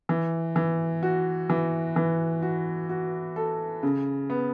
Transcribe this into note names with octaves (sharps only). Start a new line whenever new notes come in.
E3
E3
F#4
E3
E3
F#4
F#4
A4
C#3
B3